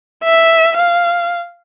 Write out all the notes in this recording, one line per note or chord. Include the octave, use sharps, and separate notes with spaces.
E5
F5